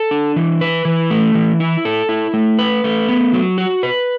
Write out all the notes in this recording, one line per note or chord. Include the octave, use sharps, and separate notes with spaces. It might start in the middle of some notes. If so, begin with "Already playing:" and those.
Already playing: A4
D4
E3
B4
E3
A3
E3
E4
A4
E4
A3
B4
A3
B3
F#3
F#4
B4